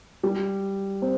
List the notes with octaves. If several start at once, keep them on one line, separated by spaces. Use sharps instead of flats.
G3
C4